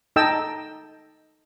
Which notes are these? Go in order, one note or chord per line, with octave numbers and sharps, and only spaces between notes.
D#4 A4 D#5 G5 A5 E6